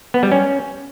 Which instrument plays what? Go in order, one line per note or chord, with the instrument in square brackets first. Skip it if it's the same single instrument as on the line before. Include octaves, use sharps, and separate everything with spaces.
[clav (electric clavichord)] B3
G3
C#4